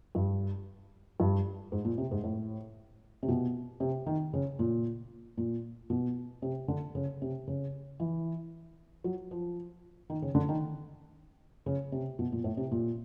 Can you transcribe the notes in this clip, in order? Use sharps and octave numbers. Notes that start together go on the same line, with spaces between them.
G2
G2
G#2
A#2
C3
G#2
A2
C3
B2
C3
D#3
C#3
A#2
A#2
B2
C3
D3
C#3
C3
C#3
E3
F#3
F3
D#3
C#3
D3
D#3
C#3
C3
B2
A#2
A2
C3
A#2